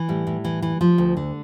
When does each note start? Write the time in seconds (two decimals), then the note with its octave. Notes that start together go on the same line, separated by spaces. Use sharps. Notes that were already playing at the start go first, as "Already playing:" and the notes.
Already playing: E3
0.08 A2 G3
0.27 A2
0.45 E3
0.62 E3
0.81 F3
0.98 D2
1.17 D3